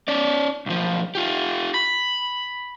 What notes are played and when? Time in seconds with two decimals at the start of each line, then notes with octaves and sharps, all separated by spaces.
0.08 C#4 D5
0.66 B1 F3
1.15 F4 G4
1.74 B5